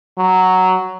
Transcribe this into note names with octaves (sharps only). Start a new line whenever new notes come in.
F#3